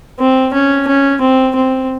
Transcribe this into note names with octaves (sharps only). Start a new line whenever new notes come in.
C4
C#4
C#4
C4
C4